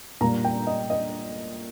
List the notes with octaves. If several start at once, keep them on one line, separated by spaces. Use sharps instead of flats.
A#2 G3 A#3 A#5
G5
D#5
D#5